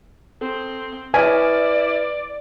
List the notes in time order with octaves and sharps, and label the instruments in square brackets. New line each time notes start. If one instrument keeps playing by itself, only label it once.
[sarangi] C4 [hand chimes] A4
[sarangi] E4 [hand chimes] B4 F6 [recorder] D5 [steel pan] G#5